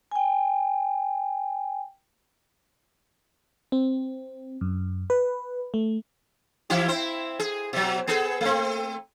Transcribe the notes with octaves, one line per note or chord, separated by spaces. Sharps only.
G5 G#5
C4
F#2
B4
A3
E3 E4 G4
C4 E4 C5
G#4
B2 F#3
B3 G#4 A4
A3 C4